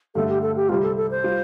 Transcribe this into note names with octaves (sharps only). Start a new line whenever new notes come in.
G2 D3 A3 A4
G4
A4
G4
C2 C3 G3 F4
A4
A4
C5
G3 F4